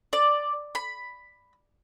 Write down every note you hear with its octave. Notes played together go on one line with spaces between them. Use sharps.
D5
B5